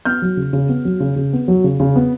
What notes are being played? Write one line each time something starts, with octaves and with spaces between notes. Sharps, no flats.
B3 F6 G6
F#3
C#3
C#3
B3
F#3
C#3
C#3
B3
F#3
C#3
C#3
B3